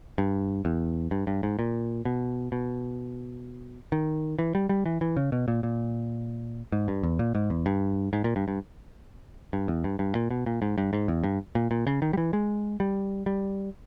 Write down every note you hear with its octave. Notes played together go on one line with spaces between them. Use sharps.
G2
E2
G2
G2
G#2
A#2
B2
B2
D#3
E3
G3
G3
E3
E3
C#3
B2
A#2
A#2
G#2
G2
E2
A#2
G#2
E2
G2
G#2
A#2
G2
G2
G2
E2
G2
G2
A#2
B2
A#2
G#2
G2
G#2
E2
G2
A#2
A#2
C#3
D#3
G3
E3
G#3
G3
G3